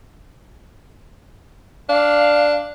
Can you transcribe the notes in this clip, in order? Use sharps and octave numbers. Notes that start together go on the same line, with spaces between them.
D4 F5